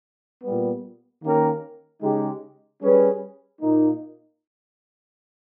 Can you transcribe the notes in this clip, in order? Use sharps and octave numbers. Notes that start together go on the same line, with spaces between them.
A#2 G3 B3
D#3 A#3 C#4 G4 A#4
C#3 G#3 D#4 G4
G3 C#4 G#4 B4
A#2 A#3 D#4